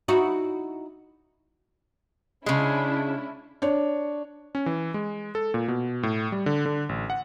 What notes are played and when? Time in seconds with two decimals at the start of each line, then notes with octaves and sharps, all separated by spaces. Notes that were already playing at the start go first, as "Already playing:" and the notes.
0.08 D#4 E4 F#4
2.46 C#3 G#3 C#4 D4 E4
3.62 D4 C#5
4.55 C#4
4.66 E3
4.94 G#3
5.35 A4
5.54 A#2
5.68 B2
6.03 A2
6.32 G3
6.46 D3
6.66 D3
6.89 A1
7.10 F#5